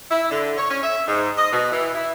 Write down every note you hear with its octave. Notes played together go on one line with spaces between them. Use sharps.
E4
D3
C#5
C#4
E5
G#2
D#5
B2
E3
E4